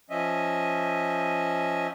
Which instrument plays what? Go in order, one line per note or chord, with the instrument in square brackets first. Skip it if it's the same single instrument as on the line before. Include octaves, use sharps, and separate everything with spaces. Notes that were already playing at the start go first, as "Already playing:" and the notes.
[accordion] F3 C#4 D#5 E5